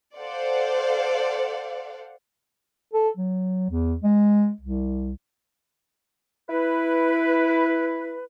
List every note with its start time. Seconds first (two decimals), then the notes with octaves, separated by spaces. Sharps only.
0.16 A4 C5 D5 F5 F#5
2.94 A4
3.17 F#3
3.71 E2
4.04 G#3
4.61 C2
6.50 E4 B4